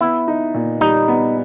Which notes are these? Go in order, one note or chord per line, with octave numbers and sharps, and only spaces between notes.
B3 E4
D#4
A#2
G3 D#4
B3